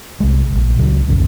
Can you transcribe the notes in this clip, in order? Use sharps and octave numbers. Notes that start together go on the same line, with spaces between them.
C2 G#3
E1 A#1
C#2 F#3
A#1 F2 C#3